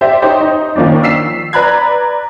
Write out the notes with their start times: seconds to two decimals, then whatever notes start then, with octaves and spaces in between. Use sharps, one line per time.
0.01 G4 C5 D5 E5
0.22 D#4 G4 C5 C#5
0.41 D#4
0.76 D#3 F3 A#3 C#4 D4
1.03 E6 B6 C7 E7
1.53 B4 D5 A#5 B5 F#6 G#6